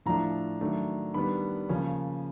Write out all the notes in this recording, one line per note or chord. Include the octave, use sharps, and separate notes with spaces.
A2 F3 A3 D4 A#5
D#3 F#3 A3 D4
D#3 G3 B3 D4 B5
C#3 F3 A#3 C#4